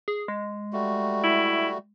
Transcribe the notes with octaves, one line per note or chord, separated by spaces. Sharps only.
G#4
G#3
G3 A3 F#4
E4